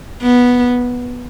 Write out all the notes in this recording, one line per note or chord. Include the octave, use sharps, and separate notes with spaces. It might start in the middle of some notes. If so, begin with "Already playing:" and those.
B3